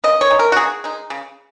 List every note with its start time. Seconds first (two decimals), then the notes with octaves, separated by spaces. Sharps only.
0.04 C#3 D#5
0.21 C#5
0.30 G#3 D#4
0.39 A#4
0.52 F#4
0.57 C#3 G#4
0.84 G#3 D#4
1.10 C#3